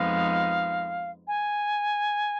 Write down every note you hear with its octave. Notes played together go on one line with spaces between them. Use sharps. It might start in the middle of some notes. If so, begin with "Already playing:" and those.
Already playing: F2 F3 G#3 B3 D#4 F5
G#5